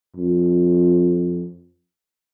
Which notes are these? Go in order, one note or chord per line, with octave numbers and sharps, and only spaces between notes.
F2